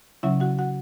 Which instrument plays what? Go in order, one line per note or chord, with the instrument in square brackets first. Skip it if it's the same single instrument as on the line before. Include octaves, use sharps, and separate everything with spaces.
[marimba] C#3 F#3 C#4 E4 E5
F#4 F#5
F#4 F#5